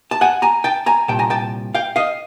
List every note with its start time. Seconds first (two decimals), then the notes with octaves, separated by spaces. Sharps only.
0.11 A5
0.21 F#5 G#5
0.42 G#5 A#5
0.64 G5 A5
0.86 G#5 A#5
1.08 C2 A#2 G5 A5
1.19 G#5 A#5
1.30 G5 A5
1.74 F5 G5
1.96 D#5 F5